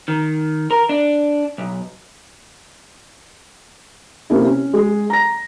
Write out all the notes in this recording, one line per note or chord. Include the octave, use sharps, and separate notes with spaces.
D#3
A#4
D4
B1
C3 A#3 C#4 E4
C#4
G#3 G#4
A#5 A#6